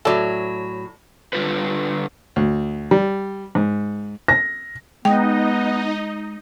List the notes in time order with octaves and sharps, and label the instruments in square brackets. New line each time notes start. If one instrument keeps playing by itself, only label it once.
[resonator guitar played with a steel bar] A2 F#3 [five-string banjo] A4 D5
[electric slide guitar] D3 G3 F4 A4 B4
[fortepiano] D2
G3
G#2
[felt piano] A#6
[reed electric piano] G#3 [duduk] B3 [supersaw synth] D#4 D#5 [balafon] G5